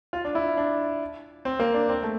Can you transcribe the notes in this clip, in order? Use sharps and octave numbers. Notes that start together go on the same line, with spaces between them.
F4
D4
E4
D4
C4
A#3
D4
C4
A3